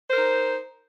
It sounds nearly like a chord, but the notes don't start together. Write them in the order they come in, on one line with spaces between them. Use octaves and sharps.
C5 A#4 D#4